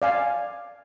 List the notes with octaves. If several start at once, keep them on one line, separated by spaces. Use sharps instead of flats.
D5 F5 G#5